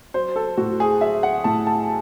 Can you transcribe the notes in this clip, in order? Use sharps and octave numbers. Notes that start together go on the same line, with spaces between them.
F#3 C5
A4
A2 F#4
G#4
F#3 E5
F#5
A2 A5
A5